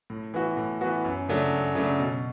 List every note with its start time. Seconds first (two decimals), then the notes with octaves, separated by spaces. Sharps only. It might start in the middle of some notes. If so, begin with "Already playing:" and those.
0.10 A2
0.34 E3 B3 F#4
0.57 A2
0.81 E3 B3 F#4
1.05 F#2
1.28 C#3 F#3 A3 D4
1.53 F#2
1.75 C#3 F#3 A3 D4
1.99 B2